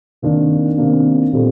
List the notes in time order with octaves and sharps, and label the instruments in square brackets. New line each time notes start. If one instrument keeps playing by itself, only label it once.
[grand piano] C3 D#3 A#3 D4
C3 D#3 A#3 D4
A#2 G3 C4 D#4 A4